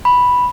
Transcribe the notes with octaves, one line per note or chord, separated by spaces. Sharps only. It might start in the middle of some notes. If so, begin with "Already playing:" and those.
B5